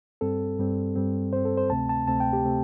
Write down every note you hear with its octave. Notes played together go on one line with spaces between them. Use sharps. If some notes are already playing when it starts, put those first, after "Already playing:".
G2 G3 C4 A4
G2 G3 C4
G2 G3 C4
G2 G3 C4 C5
A4
C5
D2 C3 A3 C4 A5
A5
D2 C3 A3 C4 A5
G5
G4
C3 A3 C4